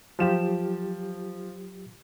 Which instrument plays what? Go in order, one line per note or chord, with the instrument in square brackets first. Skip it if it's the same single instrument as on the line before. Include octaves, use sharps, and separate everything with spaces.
[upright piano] F3 E7 [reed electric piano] F#3 F4 G4